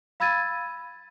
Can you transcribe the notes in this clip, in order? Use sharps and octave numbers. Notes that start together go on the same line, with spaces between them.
F5 B5 E6 G#6 A6 D#7